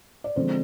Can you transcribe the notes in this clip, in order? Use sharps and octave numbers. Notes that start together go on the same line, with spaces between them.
D5
D3 F3 G#3 C4 C5